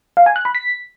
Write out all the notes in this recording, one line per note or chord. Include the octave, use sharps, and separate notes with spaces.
F5
G#5
F#6
B5
B6